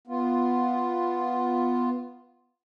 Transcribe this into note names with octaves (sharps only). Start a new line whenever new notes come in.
B3 F4